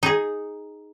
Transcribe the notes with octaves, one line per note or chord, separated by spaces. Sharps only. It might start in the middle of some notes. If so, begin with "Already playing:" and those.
D#4 G#4